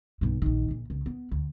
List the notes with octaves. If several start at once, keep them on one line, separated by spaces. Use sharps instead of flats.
B1 G2
A#1 D#3
A#1
C#2
B3
D2